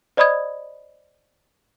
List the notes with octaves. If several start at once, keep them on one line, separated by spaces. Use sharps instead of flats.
C5 D5 D#5 B5 D#6 G#6